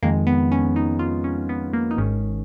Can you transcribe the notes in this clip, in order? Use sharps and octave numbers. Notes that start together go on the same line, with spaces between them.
F2 D#3 G#3 A#3
B3
C#4
D#4
F4
C#4
B3
A#3
D#4
G#1 G#2 D#3 C#4